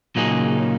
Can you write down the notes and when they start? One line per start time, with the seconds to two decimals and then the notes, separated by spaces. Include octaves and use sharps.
0.16 A#2 C#3 F#3 A#3 D#4 G#4